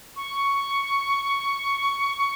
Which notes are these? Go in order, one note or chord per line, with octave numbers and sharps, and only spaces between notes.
C#6